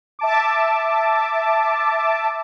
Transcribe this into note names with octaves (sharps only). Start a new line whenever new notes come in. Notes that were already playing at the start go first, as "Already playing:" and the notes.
E5 A5 D6